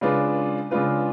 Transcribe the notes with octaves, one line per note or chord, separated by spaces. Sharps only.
C#3 G#3 D4 F4 B4
C#3 G#3 D4 F4 B4